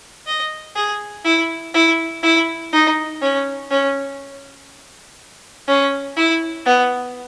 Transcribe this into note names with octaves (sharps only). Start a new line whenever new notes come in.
D#5
G#4
E4
E4
E4
D#4
C#4
C#4
C#4
E4
B3